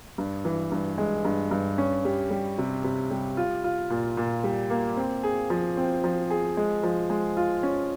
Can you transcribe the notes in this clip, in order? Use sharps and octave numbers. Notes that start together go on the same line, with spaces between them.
G2
E3
G2
G#3
G2
G2
C#4
G3
G3
C3
C3
G3
F4
F4
A#2
A#2
G3
A#3
C4
G#4
F3
C4
F3
G#4
G#3
F3
G#3
F4
C#4